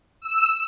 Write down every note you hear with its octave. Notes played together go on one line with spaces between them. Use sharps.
E6